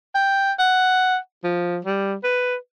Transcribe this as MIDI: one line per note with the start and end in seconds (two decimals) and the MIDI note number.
0.15 0.52 79
0.59 1.17 78
1.44 1.78 53
1.85 2.15 55
2.24 2.56 71